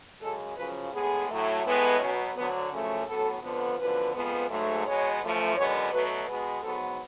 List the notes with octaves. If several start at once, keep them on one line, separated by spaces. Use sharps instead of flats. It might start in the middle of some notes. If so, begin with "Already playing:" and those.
F#2 C#3 G#3 A4
F#2 C#3 F3 B4
A2 G#3 B3 G#4
A2 F#3 A3
A2 G#3 B3
B2 F#3 B3 C#4
D2 D3 F#3 B3
F#2 C#3 F3 A3
A2 F#3 B3 A4
F2 D3 F3 B3
F#2 D3 F3 B3 B4
F2 F3 G#3 B3
G#2 F#3 A3
B2 G#3 B3 C#5
F#2 F3 A3
F#2 D3 G#3 B3 C#5
B2 F#3 A3 B4
B2 G#3 B3 B4
G#2 F#3 B3 A4